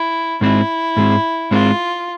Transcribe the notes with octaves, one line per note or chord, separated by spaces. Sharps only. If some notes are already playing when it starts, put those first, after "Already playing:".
Already playing: E4
G#2 G#3 C4 E4
G#2 G#3 C4
G#2 G#3 C4 F4